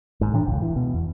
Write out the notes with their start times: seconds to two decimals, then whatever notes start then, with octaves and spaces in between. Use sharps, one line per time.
0.21 G#1 G#2
0.33 A2 E3 D4
0.46 F1 C#2
0.62 E3
0.76 B2
0.94 E2